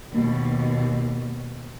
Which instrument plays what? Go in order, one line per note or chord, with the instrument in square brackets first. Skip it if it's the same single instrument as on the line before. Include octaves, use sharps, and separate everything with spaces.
[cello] D#2 B2